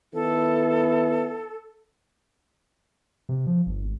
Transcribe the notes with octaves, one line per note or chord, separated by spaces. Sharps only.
D#3 B3 E4 A4
C3
F3
G1
G#1